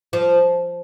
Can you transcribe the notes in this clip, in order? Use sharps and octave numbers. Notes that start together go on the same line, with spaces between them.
F3